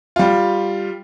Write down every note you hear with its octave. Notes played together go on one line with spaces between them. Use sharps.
G3 F4